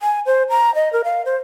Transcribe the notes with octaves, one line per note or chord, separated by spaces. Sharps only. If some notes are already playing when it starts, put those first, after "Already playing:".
G#5
C5
A#5
D#5
A#4
F5
C5